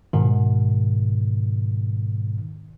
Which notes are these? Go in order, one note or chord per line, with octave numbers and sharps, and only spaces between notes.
G#2 B2 D#3